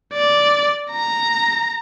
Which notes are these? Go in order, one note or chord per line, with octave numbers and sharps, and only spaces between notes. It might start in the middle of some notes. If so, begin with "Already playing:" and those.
D5
A#5